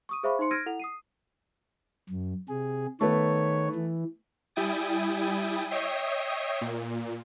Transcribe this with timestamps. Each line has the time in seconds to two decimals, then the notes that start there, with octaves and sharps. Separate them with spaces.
0.09 C#6 D#6 D#7
0.23 G#4 C5 E5 F5 B5 C#6
0.39 D#4 C5 C6 C#7
0.51 E6 F6 G#6 A#6 D7 D#7
0.66 E4 A4 F#5 F7
0.80 D#6 C7 D#7
2.09 F#2
2.49 C3 G#4
3.01 D#3 A3 B3 C#5
3.75 E3
4.56 G3 E4 G5 G#5 D#6 A6
5.70 C#5 D#5 E5 G5 D#6 C7
6.61 A#2